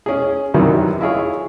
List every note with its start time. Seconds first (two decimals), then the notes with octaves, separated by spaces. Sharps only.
0.06 C#4 G#4
0.54 F#2 C3 D#3 E3 F#3 G3
1.01 E4 F4 G#4 C#5